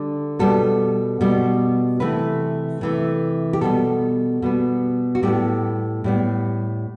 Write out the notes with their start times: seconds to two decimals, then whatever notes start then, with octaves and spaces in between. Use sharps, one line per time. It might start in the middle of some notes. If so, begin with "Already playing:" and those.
Already playing: D3 G3
0.39 B2 G3 B3 A4
1.21 B2 G3 B3
2.00 C3 E3 A3 B4
2.81 C3 E3 A3
3.53 G4
3.61 B2 G3 B3 A4
4.42 B2 G3 B3
5.15 F#4
5.23 A2 G3 B3 G4
6.04 A2 G3 B3